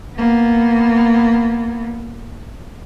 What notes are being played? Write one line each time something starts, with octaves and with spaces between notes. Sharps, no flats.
A#3 B3